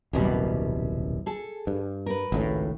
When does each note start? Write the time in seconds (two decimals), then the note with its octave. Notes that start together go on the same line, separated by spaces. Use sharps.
0.13 D#1 C2 F#2 B2 G3
1.26 G#4 A4
1.67 G2
2.06 A#4 B4
2.32 G#1 C#2 A2